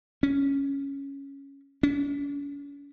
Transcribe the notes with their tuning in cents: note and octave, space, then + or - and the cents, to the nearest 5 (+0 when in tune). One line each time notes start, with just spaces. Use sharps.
C#4 +0
C#4 +40